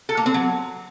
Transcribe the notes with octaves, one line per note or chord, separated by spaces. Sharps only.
A4
A#3
C4
F#3